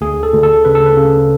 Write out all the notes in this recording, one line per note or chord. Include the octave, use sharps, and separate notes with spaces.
D2 G#4
A4
D2
A4
C#3 B4
A4
B4
C#3